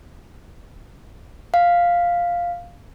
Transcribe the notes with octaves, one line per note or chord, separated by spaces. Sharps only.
F5